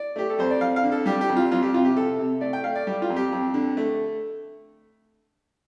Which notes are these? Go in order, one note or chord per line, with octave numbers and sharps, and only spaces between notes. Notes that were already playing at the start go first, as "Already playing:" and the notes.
Already playing: D5
A3 G4
A4
F2 C5
D5
F2 F5
F5
D3
A4
G3 G4
G4
F2
F4
F2 F4
G4
C3 F4
G4
C3 A4
C3
A3 D5
G5
A3 F5
D5
G3 G4
F4
F2
G4
F2
D3
A3